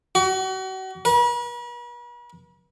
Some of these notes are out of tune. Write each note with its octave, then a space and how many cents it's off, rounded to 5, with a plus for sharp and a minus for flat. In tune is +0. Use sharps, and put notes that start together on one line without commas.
F#4 +35
B4 -45